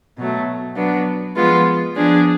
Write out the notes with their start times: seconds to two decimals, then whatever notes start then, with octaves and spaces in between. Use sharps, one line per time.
0.18 B2 F#3 A3
0.76 F#3 B3 D4
1.36 F3 G#3 B3 F4
1.96 F3 B3 D4 G#4